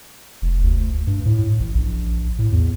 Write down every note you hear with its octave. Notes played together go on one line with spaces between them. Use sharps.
F1
D2
G2
A2
A1
A#1
A2
E2